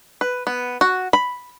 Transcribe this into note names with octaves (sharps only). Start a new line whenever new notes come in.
B4
B3
F#4
B5